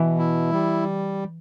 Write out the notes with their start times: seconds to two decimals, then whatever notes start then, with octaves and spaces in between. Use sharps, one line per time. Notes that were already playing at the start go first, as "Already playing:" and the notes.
Already playing: B2 E3
0.19 E4
0.53 G3